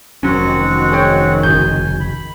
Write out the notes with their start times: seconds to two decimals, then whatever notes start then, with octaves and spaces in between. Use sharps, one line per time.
0.23 F1 D#3 F#3 C4 C#4 F#4 F#5
0.92 G#4 C#5 G5
1.43 G#1 C#3 G#5 G6
2.00 B5